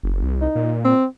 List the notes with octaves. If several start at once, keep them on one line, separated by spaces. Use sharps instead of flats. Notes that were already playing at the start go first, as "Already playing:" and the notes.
F#1
C2
D#4
A#2
C4